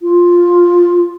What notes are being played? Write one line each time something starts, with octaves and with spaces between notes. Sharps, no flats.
F4